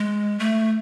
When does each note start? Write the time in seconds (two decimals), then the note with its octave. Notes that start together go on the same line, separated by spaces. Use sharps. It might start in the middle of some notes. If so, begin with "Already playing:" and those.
Already playing: G#3
0.39 A3